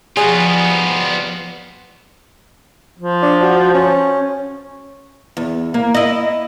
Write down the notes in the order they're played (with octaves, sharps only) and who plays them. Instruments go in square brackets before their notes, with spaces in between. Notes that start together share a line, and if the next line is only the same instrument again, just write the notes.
[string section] F3 [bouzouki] G3 D#4 F#4 [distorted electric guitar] B3 F4 [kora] G#4
[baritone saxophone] F3
[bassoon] D4
F#4
C#4
[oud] E2
A#3
E4 D#5